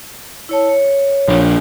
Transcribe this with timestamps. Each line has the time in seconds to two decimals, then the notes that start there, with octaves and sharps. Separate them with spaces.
0.49 E4 C#5 A5
0.69 C#5
1.28 A#1